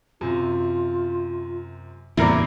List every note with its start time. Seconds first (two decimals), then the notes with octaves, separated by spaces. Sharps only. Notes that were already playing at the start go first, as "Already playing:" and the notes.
0.21 F#2 C3 F4
2.17 A#1 E2 A2 C3 G3 E4 A#4 D5